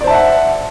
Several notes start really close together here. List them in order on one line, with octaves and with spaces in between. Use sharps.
D5 C5 A5 E5 F#5